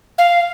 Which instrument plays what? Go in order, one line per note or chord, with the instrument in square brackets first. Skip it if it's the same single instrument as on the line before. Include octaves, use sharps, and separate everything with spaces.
[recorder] F5